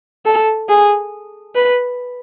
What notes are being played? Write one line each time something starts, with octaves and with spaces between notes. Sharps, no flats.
A4
G#4
B4